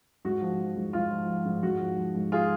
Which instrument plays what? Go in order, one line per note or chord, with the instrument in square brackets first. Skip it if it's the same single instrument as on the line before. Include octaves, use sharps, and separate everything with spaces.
[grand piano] G#2 F#4
F3
F3
G#2
G#2 F4
F3
F3
G#2
G#2 F#4
F3
F3
G#2
F4 G#4